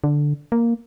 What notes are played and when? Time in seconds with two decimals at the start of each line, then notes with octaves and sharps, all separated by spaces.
0.04 D3
0.52 A#3